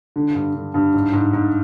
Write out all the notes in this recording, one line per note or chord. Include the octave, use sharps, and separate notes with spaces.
D3
G2
D3
G2
G#2
G#2
G#2